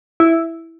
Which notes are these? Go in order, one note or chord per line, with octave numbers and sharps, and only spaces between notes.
E4